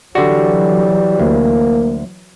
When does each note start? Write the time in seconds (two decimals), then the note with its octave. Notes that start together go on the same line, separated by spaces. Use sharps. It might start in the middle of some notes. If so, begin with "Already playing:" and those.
0.15 D3 E3 F#3 G3 F#4
1.19 D2 A#3